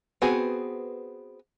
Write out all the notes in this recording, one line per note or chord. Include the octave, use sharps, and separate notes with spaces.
B3 C4 F#4 G#4 B4